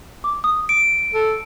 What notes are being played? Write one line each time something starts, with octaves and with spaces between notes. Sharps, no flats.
D6
D#6
D7
A4